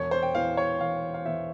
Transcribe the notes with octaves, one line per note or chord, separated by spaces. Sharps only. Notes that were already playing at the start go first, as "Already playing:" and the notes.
Already playing: E1 C#5
C5
G5
E2 E3 F5
C#5
E1 F5
F5
E2 E3 E5